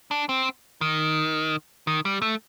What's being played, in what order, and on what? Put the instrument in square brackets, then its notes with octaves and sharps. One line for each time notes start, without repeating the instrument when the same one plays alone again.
[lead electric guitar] D4
C4
D#3
D#3
G3
A3